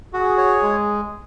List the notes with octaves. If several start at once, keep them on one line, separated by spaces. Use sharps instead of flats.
F#4 G#4
C#5
G#3